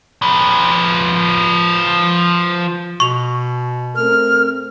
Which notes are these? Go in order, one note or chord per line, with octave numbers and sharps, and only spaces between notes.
F3 B4
B2 C#6 F7
A3 C4 A#4 F6